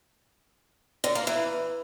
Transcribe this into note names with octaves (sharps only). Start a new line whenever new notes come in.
D3
A#3
E3